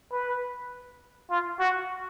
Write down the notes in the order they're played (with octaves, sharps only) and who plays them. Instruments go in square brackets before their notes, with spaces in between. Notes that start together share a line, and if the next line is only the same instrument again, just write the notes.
[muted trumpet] B4
F4
F#4